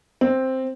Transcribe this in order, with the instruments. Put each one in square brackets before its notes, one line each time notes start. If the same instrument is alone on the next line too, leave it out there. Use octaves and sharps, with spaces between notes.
[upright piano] C4